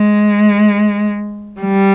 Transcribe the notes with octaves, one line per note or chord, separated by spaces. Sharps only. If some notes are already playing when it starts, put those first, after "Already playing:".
Already playing: G#3
G3